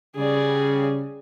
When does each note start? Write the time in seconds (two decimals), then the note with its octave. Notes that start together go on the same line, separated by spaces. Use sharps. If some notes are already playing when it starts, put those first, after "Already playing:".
0.16 C#3 G3 G#4 D5